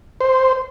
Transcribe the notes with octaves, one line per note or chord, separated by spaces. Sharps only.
C5